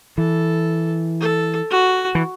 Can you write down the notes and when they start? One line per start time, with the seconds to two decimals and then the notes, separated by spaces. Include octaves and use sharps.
0.18 E3 A4
1.20 A4
1.71 F#4
2.15 E3